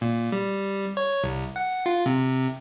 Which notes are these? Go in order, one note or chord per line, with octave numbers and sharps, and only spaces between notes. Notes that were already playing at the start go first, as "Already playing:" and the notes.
A#2
G3
C#5
C2
F#5
F4
C3